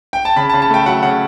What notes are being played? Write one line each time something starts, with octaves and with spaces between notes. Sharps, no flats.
G5
A5
C#3 B5
A5
C#3
A5
A3 G5
F#3 F#5
C#3 F#5